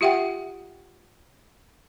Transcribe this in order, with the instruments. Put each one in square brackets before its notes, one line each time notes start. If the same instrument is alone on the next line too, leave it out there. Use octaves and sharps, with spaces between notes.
[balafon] F4 G4 E5 F#5 G5